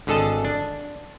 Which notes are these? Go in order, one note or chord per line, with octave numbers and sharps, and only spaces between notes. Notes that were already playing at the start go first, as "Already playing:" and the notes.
G#1 D3 G#4 A4 D#5 A5
D4